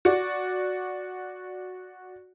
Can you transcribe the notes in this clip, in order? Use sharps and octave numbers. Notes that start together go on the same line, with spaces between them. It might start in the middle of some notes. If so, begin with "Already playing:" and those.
F#4 D5